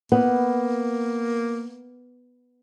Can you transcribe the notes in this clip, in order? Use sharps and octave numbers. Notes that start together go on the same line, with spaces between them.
A#3 B3